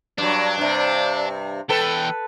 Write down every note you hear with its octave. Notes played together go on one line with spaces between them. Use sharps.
G2 F#3 D4
G2 C3
E2 A4 B4 G5